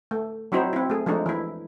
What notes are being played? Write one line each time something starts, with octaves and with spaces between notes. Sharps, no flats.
A3
F#3 C4 D#4 E4 F#4 C5
C4 E4
A3 G#4
F3 G#3 A3 D4 D#4
E3 E4